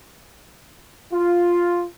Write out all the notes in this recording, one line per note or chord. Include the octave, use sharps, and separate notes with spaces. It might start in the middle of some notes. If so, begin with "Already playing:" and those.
F4